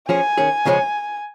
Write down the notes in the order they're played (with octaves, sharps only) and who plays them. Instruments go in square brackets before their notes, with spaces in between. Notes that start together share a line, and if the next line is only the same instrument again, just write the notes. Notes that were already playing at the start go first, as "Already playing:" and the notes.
[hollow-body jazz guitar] F3 C#4 G#4 [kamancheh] G#5
[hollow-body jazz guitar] D#3 C#4 G#4
C#2 C#3 F3 G#3 C#4